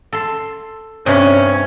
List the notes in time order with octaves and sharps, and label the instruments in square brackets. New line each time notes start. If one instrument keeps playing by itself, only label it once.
[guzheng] A4 C6
[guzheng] G2 C3 [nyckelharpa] C#4